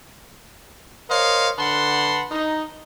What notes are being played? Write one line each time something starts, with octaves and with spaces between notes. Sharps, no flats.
A#4 C5 C#5 D#5 F5
D3 B4 F#5 A5 C6
D#4